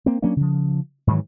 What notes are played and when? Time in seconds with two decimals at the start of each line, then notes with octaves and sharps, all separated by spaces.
0.06 A#3 C4
0.22 F#3 A#3 C#4 D4
0.36 C#3 F3
1.07 G#2 D#3 E3 F#3